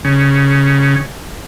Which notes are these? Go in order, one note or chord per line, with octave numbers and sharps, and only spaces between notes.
C#3